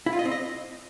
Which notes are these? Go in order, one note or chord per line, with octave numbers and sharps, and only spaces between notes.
E4
F4
D#5
C4
D#5